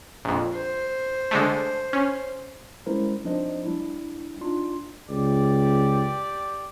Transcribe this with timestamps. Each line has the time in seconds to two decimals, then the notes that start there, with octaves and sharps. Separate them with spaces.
0.25 A#1 F2
0.54 C5
1.31 D3 G#3 A3
1.93 C#4
2.86 G3 G#3 C#4 E4 A#4 C5
3.24 F3 C4 D4 D#4 C5 D#5
3.63 G3 D4 E4
4.41 D4 D#4 F4 C6
5.09 C#2 G4 D5